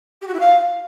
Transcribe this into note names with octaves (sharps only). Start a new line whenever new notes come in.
G4
F#4
E4
F5